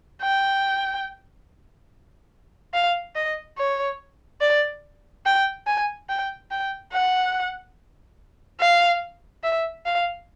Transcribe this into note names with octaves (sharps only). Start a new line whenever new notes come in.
G5
F5
D#5
C#5
D5
G5
G#5
G5
G5
F#5
F5
E5
F5